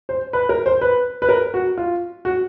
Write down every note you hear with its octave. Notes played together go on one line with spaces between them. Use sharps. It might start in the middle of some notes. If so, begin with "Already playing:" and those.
C5
B4
A#4
C5
B4
B4
A#4
F#4
F4
F#4